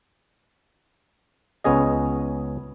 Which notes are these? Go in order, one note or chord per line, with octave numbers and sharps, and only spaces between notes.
C#2 B3 C#4 G#4 D#5